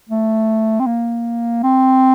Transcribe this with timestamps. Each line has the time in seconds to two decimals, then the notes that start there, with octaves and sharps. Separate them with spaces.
0.09 A3
0.80 C4
0.86 A#3
1.63 C4